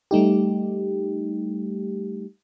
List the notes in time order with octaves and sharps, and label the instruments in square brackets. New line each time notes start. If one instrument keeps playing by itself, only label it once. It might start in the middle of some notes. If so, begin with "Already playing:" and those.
[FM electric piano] G3 A3 D#4 G4